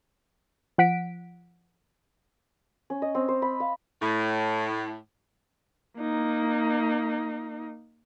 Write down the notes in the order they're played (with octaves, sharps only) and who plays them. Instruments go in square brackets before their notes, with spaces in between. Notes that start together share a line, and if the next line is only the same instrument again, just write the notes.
[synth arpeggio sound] F3 F#5 B6 D7
[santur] C#4
D#5
C4
C5
B5
F5
[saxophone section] A2
[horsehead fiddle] A#3 D#4